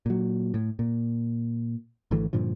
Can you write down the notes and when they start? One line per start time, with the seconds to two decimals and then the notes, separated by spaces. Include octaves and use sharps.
0.06 A#2 F#3
0.54 A2
0.79 A#2
2.11 G#1 D3 E3 A3
2.33 G2 A#2 D3 F3